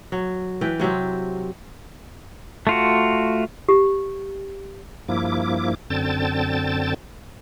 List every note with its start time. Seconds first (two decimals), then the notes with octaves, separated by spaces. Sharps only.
0.12 F#3
0.61 E3 B4 G5
0.80 C3 F#3 C4 G4
2.67 A3 F4 F#4
3.69 G4
5.08 G2 F3 A#3 E4 D6
5.90 F#2 D3 C4 G5 A5 A6